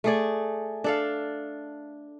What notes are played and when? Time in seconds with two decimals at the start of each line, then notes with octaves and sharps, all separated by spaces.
0.04 A3 G#4 D5
0.84 D4 A4 F5